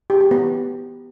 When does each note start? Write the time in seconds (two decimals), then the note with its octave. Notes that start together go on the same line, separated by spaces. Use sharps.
0.10 G4
0.20 G4
0.31 B3